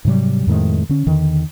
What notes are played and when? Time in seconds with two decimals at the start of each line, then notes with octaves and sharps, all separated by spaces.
0.05 G#2 C3 F#3 G3
0.47 F2 A2 D#3 G#3
0.89 D3 C#4
1.07 E2 D3 D#3